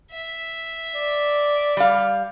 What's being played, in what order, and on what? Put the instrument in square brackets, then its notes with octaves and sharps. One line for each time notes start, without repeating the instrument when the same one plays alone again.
[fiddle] E5
[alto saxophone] D5
[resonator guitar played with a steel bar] G3 F5